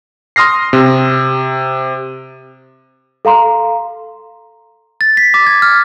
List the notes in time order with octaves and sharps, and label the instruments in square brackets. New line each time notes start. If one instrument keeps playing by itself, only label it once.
[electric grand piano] C6 D#6 F6 A#6 C7
C3
[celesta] A4 F5 A#5 C6
[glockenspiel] A6
B6
D6
G#6
F6